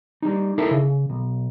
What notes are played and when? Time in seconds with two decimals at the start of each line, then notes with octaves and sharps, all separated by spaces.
0.22 G3 D#4
0.58 D#4 E4 A4 A#4
0.71 C#3
1.10 B1